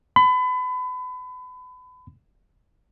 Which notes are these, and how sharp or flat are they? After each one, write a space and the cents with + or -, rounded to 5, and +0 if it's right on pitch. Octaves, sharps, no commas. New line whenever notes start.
B5 +30